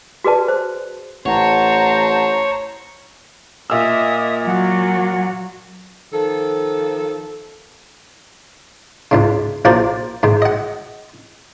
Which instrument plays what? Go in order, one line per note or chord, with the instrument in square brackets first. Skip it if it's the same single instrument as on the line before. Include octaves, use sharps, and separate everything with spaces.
[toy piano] F#4 G#4 B4 D5 A5
C5
[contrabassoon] A1 [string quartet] C5 A5 A#5 [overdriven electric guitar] C#5 [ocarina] F#5
[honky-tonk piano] A#2 E6 [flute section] D#5 E5 D#6
[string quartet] F#3 [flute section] F#5
[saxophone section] D#3 F3 A4
[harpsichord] C#2 G#2 C#3
A#1 F4 A#4 C5 D5
G#2 D#3
D#5 F#5